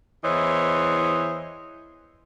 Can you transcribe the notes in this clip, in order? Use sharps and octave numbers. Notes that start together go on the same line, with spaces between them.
E2 E3 C5 C#5 D#5